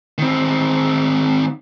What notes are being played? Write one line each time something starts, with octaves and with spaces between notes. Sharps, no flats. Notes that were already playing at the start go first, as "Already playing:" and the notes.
D#3 C4